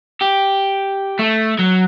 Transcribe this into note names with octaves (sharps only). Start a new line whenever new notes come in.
G4
A3
F#3